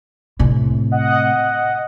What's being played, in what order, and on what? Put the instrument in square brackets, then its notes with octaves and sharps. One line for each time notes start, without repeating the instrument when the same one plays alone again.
[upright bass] A2 C3
[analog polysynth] D#5 F#5